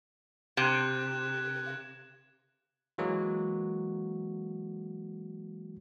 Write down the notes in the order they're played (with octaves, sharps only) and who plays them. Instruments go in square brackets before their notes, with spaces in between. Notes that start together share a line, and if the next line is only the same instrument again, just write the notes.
[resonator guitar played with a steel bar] C3 [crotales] F#6 G#6 E7
[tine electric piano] E3 F#3 G#3 A#3 F#4